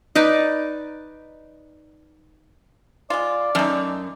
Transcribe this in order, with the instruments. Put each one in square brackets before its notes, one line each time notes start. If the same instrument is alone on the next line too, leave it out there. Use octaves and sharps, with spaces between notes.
[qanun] D#4 B4 D5
[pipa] G#3 F4 [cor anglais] D5
[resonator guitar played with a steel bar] F#2 [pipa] A3 D#4